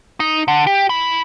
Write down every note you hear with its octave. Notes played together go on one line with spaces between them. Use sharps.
D#4
D3
G4
E4 B5